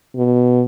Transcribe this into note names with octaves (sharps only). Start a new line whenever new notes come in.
B2